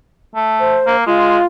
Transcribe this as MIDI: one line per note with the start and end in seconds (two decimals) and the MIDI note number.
0.35 0.79 57
0.60 0.96 72
0.87 1.06 58
1.07 1.39 56
1.07 1.46 65